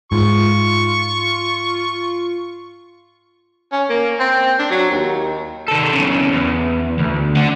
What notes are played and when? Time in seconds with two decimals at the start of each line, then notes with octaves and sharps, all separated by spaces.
0.12 G#2 F4 C#6
3.72 C#4
3.90 A#3
4.19 C4
4.59 D4
4.70 F#3
4.90 D#2
5.68 D#3 A4
5.93 B1 C#3
6.33 E2
6.99 D2
7.36 D4 F#5